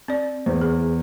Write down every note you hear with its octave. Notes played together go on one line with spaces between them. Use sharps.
C4 D5
E2 C5
G#4